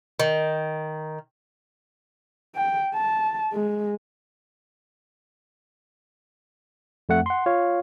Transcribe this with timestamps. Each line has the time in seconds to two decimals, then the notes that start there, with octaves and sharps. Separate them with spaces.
0.20 D#3
2.56 G5
2.95 A5
3.53 G#3
7.09 F2 A3 F#5
7.26 F#5 C6
7.46 F4 C#5 F5